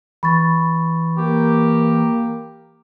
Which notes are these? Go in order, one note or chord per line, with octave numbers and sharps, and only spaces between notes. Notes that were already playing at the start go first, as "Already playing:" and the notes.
E3 B5 C#6 A6
A#3 G4 A#4